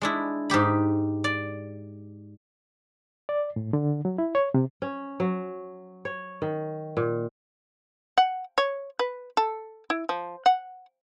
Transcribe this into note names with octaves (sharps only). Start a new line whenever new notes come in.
G#3 D4 E4
G#2 D#4 G4 B5
D5
D5
A2
D3
F#3
E4
C#5
C3
C#4
F#3
C#5
D#3
A#2
F#5
C#5
B4
A4
E4
F3
F#5